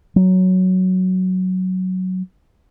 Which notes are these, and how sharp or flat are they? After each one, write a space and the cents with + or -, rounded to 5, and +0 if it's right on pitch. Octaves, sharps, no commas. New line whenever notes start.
F#3 +5